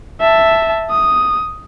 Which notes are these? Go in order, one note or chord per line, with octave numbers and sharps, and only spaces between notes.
E5 A5
D#6